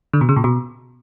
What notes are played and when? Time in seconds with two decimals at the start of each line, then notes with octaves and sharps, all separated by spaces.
0.13 D3
0.21 B2
0.29 C#3
0.36 A#2
0.44 B2